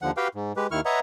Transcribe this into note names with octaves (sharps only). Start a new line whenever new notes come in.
D#2 D3 F3 F#5
F#4 G4 B4 F5 G5
G#2
G#3 G4 B4
D#2 D#3 E4 C#6 F6
B4 C#5 D#5 E5 F#5 A#5